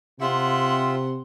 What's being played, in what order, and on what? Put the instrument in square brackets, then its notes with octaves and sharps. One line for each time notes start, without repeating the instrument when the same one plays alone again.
[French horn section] C3 [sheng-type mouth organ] F4 E5 [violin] F#5 C6